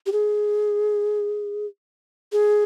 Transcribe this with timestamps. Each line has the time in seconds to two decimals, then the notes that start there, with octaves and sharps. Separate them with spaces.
0.06 G4
0.12 G#4
2.32 G#4